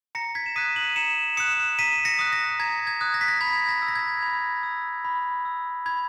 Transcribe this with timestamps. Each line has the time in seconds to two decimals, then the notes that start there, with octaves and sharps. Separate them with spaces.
0.15 A#5 A#6 C#7
0.35 G#6 B6
0.46 E7
0.56 D#6 F#6 B6 D#7
0.76 D#7 F#7
0.96 A#5 C#7 E7
1.37 D#6 F#6 C#7 E7
1.79 A#5 B6 D#7
2.05 A#6 C#7
2.19 D#6 F#6
2.33 A#6
2.60 A#5 G#6
2.87 G#6
3.01 D#6 F#6
3.14 A#6
3.21 B6
3.28 A#6
3.41 B5 G#6
3.69 A#6
3.82 E6
3.88 A#6
3.95 G#6
4.23 B5
4.63 E6
5.05 B5
5.45 E6
5.86 B5 G#6